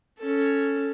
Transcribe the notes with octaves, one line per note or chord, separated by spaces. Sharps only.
C#4 A4